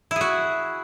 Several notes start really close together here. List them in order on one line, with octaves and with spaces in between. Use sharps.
E4 G#4 F#4